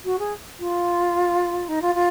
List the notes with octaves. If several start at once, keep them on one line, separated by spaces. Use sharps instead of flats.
F#4
G#4
F4
D#4
F4
F4